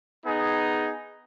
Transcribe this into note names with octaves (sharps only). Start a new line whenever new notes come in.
B3 D#4 G#4